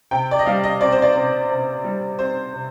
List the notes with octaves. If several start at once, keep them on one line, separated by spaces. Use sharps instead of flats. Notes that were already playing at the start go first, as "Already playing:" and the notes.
C3 G5
D5
D#5
G3 F5
D#5
C4 D5
C5
D5
C3
C3
G3
C4 C5
C3